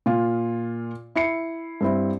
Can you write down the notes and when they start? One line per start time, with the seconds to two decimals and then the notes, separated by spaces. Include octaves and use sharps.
0.06 A#2 F4
1.15 E4 C7 C#7
1.81 G2 C4 E4